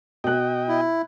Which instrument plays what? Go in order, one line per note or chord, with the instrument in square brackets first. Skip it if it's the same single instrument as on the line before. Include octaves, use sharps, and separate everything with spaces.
[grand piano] B2 F#6 [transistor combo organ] D#5 G5
[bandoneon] E4